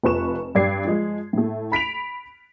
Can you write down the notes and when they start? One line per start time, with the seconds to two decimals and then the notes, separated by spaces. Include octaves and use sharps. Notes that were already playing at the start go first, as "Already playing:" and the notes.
0.03 F1 F4 B4 C#6 E7
0.55 G2 G4 D5 G#6 C7
0.85 F3 G#3
1.33 A2 A3
1.72 B5 B6 D7 F7